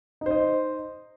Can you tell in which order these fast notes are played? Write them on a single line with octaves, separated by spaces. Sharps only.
D#4 C5 D#5